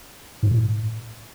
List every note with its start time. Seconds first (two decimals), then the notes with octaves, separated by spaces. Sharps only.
0.43 G#2
0.51 A2